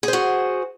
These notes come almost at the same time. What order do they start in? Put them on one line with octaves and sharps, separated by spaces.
G#4 C5 F#4